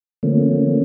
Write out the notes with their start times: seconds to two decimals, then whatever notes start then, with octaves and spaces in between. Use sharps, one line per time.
0.23 D3 F3 A3 A#3 C4 C#4